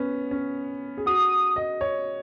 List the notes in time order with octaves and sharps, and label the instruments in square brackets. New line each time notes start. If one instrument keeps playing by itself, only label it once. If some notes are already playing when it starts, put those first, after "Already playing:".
Already playing: [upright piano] B3 C#4
C#4
G#4
[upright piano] F#4 [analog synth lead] D#6
[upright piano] D#5
C#5